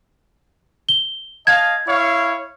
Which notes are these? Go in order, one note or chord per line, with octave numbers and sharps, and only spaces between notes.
G7
D#5 F5 A5 G#6
E4 C#5 F5